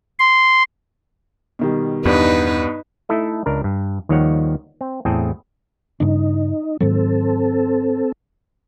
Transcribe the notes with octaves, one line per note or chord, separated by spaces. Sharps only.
C6
B2 D#3 G3
E2 G2 B3 D#4 B4 D5
A3 D#4 E4 A4 D#5
C#2 D4 A#4
G2
D#2 D#3 F3 G3 C#5 F#5
C4
E2 A2 C4 G#4 A4 G5
G2 C#3 D4 D#4
G#2 D#3 F#3 C4 A4